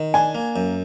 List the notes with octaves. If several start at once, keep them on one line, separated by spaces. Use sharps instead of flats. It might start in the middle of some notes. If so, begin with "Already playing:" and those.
Already playing: D#3
D4 G#5
A#3
F#2